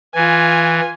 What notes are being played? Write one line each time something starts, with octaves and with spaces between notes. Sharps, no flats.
E3 F4 G#5